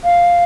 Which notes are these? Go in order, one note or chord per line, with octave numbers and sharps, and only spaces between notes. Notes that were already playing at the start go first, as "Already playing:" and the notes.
F5